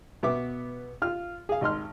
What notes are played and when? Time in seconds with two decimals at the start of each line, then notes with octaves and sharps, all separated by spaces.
0.23 B2 B3 E5 D6
1.02 F4 F6
1.49 G#4 F5
1.61 G#1 D#5 C6 F6